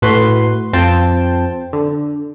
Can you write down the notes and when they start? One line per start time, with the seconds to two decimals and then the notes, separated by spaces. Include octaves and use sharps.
0.02 A2 F#4 B4 C6
0.73 F2 C4 F4 G5 A5
1.73 D3